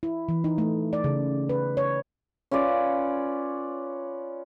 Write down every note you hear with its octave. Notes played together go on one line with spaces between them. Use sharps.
E4
E3
D#4
A3
D5
C#3
B4
C#5
C#4 F4 B4 D5